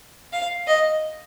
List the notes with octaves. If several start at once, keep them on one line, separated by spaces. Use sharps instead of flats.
F5
D#5